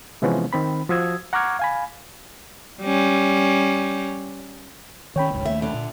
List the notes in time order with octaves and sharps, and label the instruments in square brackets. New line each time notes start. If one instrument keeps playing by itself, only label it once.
[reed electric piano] C3 E3 F3 G#3 B3 C#4
D#3 C4 B5
F3 F#4 D#6 E6 G#6
F#5 A#5 C#6 D6 F6 G#6
F5 G#5 B5
[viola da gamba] G3 C#4
[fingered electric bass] D#3 C#4 [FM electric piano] C#5 G5 B5
[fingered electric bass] F1 C#2 G#2
[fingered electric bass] D#2 A3 [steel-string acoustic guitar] E5
[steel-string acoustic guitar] D3
[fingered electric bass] A#2